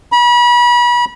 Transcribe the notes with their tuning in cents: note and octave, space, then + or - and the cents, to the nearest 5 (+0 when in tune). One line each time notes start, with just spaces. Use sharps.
B5 -35